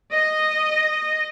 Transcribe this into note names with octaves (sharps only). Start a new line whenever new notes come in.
D#5